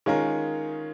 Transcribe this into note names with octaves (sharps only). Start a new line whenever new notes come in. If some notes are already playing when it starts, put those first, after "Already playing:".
D#3 G#3 C#4 F4 A#4